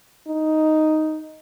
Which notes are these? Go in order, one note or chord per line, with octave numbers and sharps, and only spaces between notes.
D#4